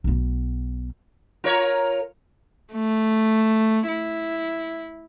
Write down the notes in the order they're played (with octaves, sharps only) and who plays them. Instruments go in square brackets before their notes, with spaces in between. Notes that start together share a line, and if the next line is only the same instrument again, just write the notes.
[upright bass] B1 B3
[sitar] F4 A#4 C#5
[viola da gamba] A3
E4